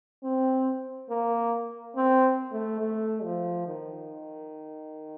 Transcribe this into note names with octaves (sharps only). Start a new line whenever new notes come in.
C4
A#3
C4
A3
A3
F3
D#3